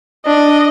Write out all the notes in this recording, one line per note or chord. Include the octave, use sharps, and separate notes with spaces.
D4 D#5